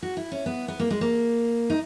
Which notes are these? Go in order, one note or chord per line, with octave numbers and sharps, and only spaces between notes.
F#4
E4
C#4
B3
B3
A#3
G#3
A#3
D#4